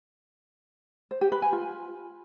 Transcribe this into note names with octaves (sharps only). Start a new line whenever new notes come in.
C5
G4
B4
G#5
F4